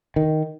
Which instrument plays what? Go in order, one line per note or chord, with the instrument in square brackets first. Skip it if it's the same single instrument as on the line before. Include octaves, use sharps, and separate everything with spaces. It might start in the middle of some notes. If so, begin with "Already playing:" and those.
[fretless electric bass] D#3